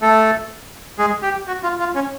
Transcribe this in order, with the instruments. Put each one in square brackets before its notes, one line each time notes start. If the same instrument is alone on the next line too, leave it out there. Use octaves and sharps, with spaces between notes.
[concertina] A3 A4
G#3 G#4
G4
F#4
F4
F4
C#4